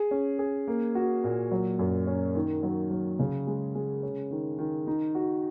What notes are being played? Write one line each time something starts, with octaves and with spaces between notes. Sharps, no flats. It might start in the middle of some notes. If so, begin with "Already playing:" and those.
Already playing: G#4
C#4
G#4
A#3
F#4
A#2
F#3
F#2
C#4
D#3
F#3
F#3
C#3
G#3
G#3
C#4
D#3
D#3
D#4
F#4